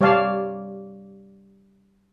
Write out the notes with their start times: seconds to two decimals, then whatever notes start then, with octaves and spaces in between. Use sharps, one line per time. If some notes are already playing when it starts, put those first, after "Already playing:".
0.01 G3 C#5 D5 F5 A5